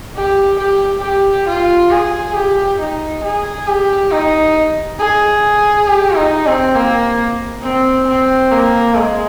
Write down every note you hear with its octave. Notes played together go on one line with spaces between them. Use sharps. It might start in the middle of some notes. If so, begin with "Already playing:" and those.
G4
G4
G4
F4
G#4
G4
D#4
G#4
G4
D#4
G#4
G4
D#4
C4
A#3
C4
C4
A#3
G#3